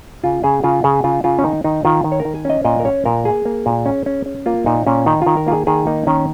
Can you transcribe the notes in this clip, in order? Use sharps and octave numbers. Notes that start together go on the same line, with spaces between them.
C#3 F4
C#3 G#4
C#3 F4
C#3 G#4
C#3 F4
C#3 F4
C#4
D#3 D#4
D#3 D#4
D#3 F4
D#3
C#5
A#4
D#3
G#5
C#4 D#5
A#2 D#5
A#4
C#4 C#5
A#2 A#4
A#3 G#4
A#3
A#2
C#4
C#4
C#4
A#3 F4
A#2 D#4
A#2 C#4
D#3 D#4
D#3 F4
A#4
A#3 F4
G#4
D#3 G#4
A#3 D#4
D#3 C#4